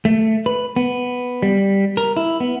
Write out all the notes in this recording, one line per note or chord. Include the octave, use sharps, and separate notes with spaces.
A3
B4
B3
G3
A#4
E4
B3